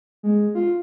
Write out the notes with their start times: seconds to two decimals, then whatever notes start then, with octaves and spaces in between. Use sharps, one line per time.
0.23 G#3
0.55 F4